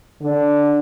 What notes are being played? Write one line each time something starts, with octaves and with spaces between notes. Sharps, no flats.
D3